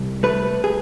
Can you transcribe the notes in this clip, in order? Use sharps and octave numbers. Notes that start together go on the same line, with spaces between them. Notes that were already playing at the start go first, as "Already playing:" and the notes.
Already playing: C2
A3 B4
G#4